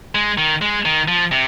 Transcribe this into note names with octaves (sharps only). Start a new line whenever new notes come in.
G#3
D#3
G#3
D#3
F3
C3